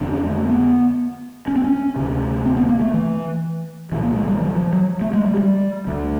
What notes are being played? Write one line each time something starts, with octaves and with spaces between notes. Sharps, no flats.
F2 D3 D4
C#4
A3
A#3
B3
C#4
C4
C#4
D2 C3
C4
B3
A#3
A3
E3
C2 A#2 E3
A#3
G#3
G3
E3
F3
F#3
A3
G#3
G3
G3
D2 D3